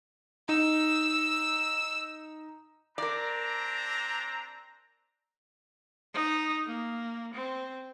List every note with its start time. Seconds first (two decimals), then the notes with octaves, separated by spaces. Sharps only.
0.49 D#4 E6
2.98 C4 D4 A#4 D5 A#5
6.14 D#4
6.67 A#3
7.34 C4